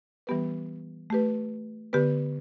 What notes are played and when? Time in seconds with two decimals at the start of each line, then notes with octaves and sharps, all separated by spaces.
0.27 E3 G3 B3 G4 B4
1.10 A3 G4 B4
1.93 D3 B3 G4 B4